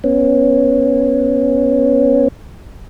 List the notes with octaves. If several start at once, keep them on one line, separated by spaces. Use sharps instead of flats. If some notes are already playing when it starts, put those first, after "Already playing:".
B3 C#4